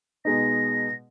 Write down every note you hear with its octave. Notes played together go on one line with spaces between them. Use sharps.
B2 G#3 D#4 A#6